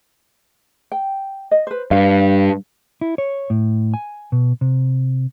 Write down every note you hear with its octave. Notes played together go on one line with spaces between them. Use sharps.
G5
D#5
B4 C5
G2 F5
E4
C#5
A2
G#5
B2
C3